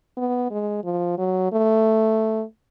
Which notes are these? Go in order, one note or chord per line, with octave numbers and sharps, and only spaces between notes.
B3
G#3
F3
F#3
A3